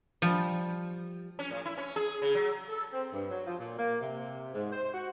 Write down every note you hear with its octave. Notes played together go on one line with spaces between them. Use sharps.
F3 G3
C#4
A2
E4
C#4
G#4
C#3
F#3
A4
C4
G2
F#3
F3
A#2
A#3
C3
G#2
C5
F#4